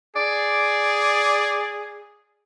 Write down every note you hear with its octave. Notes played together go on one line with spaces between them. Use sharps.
G#4 D5